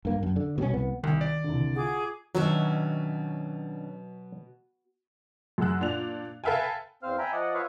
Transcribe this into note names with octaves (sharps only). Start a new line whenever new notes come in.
G2 A#3
F#2
D3
B2 G3 B3 C#4
C2 B3
C2 D#3
D5
C2 D3
F4 G#4 F#5 D6
B2 D#3 F#3 C#4 D4 F#4 E5
F#2 G#4 F#5 E6 F#6
A#2 D4 D5 F7
A4 B4 E5 F5 G5 G#5
E2 C4 C5 F5 F6
E5 G5 G#5 A#5 B5
F3 D5 D#5 F#5
F4 B4 C#5 E5 F5 C#6